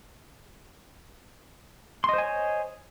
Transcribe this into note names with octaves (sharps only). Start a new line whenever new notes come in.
C5 C#5 D#5 G#5 C6